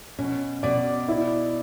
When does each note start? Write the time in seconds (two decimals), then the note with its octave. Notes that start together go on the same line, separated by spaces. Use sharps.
0.19 B2 C#4
0.63 B2 D5
1.08 E4